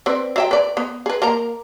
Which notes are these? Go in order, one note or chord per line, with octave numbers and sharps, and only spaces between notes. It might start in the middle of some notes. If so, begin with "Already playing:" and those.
C4 B4 D5
F#3 E5 G5
B4 D5
B3
G#4 B4
A#3 A#4 A#5